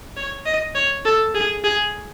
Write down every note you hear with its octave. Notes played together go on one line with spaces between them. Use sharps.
C#5
D#5
C#5
A4
G#4
G#4